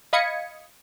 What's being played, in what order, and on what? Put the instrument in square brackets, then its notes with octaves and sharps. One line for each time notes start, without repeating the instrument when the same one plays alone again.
[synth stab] D#5 F5 B5 D#6 G#6 C#7